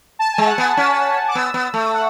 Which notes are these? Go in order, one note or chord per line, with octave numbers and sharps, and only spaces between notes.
A5
G#5
G#3
F#5
B3 G#5
C#4
D6
B3 E6
B3
A3
F#5